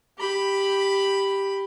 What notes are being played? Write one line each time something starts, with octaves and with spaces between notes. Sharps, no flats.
G4 B5